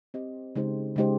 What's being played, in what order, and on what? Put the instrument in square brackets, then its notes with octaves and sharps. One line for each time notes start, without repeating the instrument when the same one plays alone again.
[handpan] C4 G4 C5 D#5
C#3 G#3 D#4 G4 C5
C#3 G#3 D#4 G4 C5